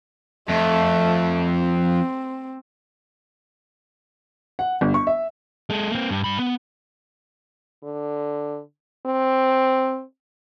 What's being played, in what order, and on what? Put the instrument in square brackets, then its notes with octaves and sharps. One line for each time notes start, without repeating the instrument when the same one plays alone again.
[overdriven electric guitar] F2 [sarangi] A3
[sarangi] C4
[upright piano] F#5
G1
C#6
E5
[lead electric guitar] G#3 A4
A#3 C4
G2
G2 B5
B3
[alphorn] D3
C4